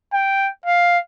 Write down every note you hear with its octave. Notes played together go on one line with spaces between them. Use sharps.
G5
F5